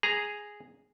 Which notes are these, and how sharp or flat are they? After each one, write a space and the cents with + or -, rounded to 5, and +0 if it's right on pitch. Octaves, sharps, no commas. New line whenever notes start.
G#4 +0 A#5 +0